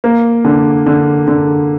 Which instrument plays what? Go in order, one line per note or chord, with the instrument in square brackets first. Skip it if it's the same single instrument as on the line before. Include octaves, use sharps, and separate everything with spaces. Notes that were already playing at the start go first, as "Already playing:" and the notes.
[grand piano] A#3
D3
D3
D3